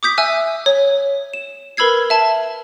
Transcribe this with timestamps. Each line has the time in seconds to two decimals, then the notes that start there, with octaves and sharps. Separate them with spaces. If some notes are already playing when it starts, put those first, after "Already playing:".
0.03 D6 D#6 G6 B6
0.18 E5 G#5 E6 F#6
0.66 C#5
1.34 E7
1.77 A#4 B4 B5 E6 G#6 C7
2.10 E5 A5